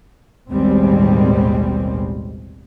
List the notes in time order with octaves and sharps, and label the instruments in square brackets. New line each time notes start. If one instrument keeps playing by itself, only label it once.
[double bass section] A1 D#2 B2 G3 G#3 C4